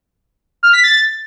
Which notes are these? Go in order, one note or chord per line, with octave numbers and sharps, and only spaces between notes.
F6
B6
A6